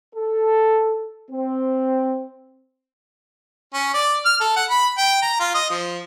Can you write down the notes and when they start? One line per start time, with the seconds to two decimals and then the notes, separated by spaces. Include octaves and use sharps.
0.15 A4
1.31 C4
3.74 C#4
3.94 D5
4.26 F6
4.40 A4
4.56 F#5
4.70 B5
4.98 G5
5.22 A#5
5.40 F4
5.55 D#5
5.70 F3